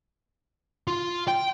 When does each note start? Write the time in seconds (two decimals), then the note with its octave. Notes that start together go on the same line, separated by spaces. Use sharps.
0.87 F4
1.28 G5